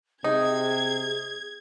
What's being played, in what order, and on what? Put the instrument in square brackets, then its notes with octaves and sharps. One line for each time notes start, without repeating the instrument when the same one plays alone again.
[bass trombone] C3 [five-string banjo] D#4 [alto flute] G#4 [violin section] G#6